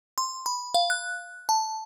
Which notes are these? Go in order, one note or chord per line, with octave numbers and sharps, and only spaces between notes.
C6
B5
F5
F#6
A5